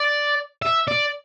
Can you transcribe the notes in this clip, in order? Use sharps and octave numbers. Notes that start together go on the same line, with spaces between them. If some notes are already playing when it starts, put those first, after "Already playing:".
Already playing: D5
E5
D5